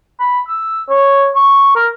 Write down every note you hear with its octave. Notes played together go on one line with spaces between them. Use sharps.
B5
E6
C#5
C#6
A#4